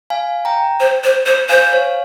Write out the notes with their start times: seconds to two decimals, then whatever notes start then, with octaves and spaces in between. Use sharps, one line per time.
0.10 F5 G#5
0.45 G5 A#5
0.80 C5
1.04 C5
1.26 C5
1.49 C5 F5 G#5
1.73 C#5 F5